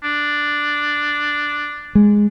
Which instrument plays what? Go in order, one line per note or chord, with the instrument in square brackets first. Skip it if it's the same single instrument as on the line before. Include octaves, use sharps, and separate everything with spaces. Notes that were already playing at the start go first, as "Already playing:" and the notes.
[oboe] D4
[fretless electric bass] G#3